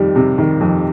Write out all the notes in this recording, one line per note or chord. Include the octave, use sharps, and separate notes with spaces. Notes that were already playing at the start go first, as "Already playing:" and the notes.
Already playing: F2 D#3 G3
C3
D#3
F2